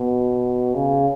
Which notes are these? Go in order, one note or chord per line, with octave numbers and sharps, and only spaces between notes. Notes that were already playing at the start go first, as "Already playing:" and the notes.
Already playing: B2
C#3